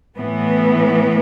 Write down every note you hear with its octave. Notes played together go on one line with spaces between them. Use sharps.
A2 E3 B3